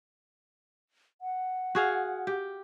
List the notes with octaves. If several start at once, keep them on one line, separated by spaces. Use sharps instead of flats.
F#5
F#4 G#4 F5
G4